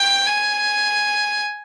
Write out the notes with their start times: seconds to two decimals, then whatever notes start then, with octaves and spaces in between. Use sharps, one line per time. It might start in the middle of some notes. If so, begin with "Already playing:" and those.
Already playing: G5
0.26 G#5